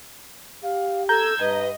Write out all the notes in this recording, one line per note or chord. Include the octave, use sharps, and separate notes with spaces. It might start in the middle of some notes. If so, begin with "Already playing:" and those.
G4 F5
A4 A#5 E6 G6 G#6
G2 B4 D#5